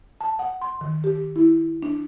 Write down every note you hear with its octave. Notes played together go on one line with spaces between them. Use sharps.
A5
F#5
C6
D#3
G4
E4
D4